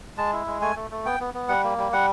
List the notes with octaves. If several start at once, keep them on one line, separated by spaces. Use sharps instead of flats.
G#3 A5
E4
G#3
A3 G#5
A3
A3
B3 G5
B3
B3
G3 F#5
A#3
G3
G3 F#5